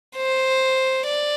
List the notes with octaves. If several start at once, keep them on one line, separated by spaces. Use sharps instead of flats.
C5
D5